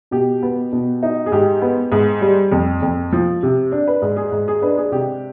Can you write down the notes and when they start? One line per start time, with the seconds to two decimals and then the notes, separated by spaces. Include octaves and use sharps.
0.11 B2 G4
0.42 B3
0.72 B2
1.03 D#4
1.26 G#4
1.32 G#2 G4
1.62 B3
1.92 G#2
2.21 G3
2.52 F2
2.82 F2
3.12 F3
3.43 C3
3.72 D4
3.87 B4
4.02 G#2
4.17 G#4
4.32 G#2
4.48 G#4
4.62 D4 B4
4.77 G#4
4.92 C3 G4